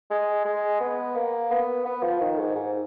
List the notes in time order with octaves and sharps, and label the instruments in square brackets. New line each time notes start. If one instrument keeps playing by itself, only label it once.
[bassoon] G#3
G#3
B3
A#3
B3
B3
F3
D#3
G#2
G#2